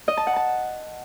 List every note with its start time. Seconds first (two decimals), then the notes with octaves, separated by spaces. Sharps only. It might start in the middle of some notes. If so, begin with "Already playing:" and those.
0.08 D#5
0.17 A5
0.27 F#5
0.36 A5